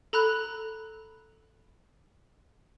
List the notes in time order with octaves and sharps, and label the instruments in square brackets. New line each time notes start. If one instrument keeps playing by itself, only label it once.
[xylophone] A4 A#5 B5 F#6